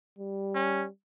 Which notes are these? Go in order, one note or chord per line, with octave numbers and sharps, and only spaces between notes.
G3
C#4